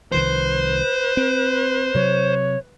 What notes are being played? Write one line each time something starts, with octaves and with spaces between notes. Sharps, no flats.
C2 D#3 F3 B4 C5
C4
C3 F#3 C#5